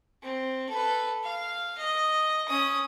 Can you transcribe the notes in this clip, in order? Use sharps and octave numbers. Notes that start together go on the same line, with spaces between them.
C4
A4 B4
F5
D#5
C#4 D#6